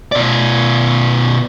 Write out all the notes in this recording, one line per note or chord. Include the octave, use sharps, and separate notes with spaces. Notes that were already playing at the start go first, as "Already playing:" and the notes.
B2 D5